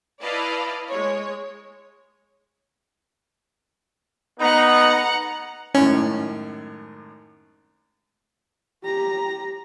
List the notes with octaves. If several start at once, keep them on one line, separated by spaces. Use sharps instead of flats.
E4 B4 D5 D#5 F5 A5
G#3 C#5
B3 D#4 F#5 A#5
G#1 F#2 A2 C#4
G4 A#5